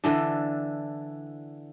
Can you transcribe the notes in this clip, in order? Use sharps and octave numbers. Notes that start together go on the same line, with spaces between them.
D3 E3 D4